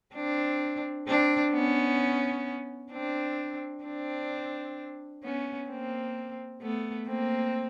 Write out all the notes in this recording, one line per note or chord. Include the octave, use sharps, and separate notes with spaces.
C4 D4
C4 D4
B3 C#4
C4 D4
C4 D4
B3 C#4
A#3 C4
A3 B3
A#3 C4